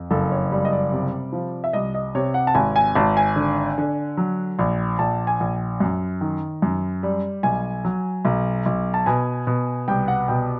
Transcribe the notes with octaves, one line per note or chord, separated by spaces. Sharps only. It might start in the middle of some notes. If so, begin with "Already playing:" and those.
Already playing: F2
F#1 A4
C#5
G3
D#5
D5
C3
F3
E5
C2 D#5
D#5
C3 C#5
F#5
A5
G#1 G#5
G#5
G#1 A5
G#5
D3
D3
F#3
A#1
A#1 A5
G#5
A#1
F#2
D#3
F#2
G3
B1 G#5
F#3
B1
B1
A5
B2 G#5
B2
C2 G5
F#5
B2 G5